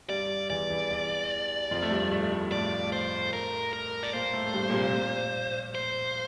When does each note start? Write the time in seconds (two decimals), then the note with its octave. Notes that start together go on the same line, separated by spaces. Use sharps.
0.09 G2 G3 D5
0.50 E2 E3 D5
0.70 E2 E3
0.90 E2 E3
1.71 F2 F3
1.82 A3
1.91 G2 G3
2.11 A2 A3
2.32 A2 A3
2.52 A2 A3 D5
2.92 C5
3.33 A#4
3.73 A#4
4.03 D5
4.13 A#2 A#3 C5
4.33 A2 A3
4.47 A3
4.54 G2 G3
4.69 A#2
4.74 C3
4.95 A#2
5.75 C5